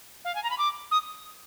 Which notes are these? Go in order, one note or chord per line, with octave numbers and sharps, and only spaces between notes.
F5
G#5
A#5
B5
D6
D#6